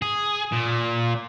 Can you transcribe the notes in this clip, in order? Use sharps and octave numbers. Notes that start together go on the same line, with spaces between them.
G#4
A#2